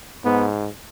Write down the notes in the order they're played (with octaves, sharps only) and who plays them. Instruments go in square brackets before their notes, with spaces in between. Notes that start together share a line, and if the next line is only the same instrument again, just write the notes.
[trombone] G#2 [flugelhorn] B3